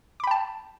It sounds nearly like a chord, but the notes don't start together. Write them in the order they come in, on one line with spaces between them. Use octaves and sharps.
D6 B5 G5 A5